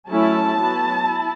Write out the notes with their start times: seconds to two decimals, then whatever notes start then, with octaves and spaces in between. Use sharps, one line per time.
0.09 F#3 A3 C#4 E4 A5
0.57 F#3 B3 E4
1.04 E4